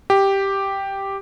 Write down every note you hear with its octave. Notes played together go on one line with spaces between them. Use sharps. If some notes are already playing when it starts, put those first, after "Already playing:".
G4